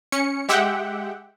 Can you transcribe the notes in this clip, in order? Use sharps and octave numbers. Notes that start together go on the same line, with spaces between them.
C#4 C#7
G#3 G4 E5 F#5 G5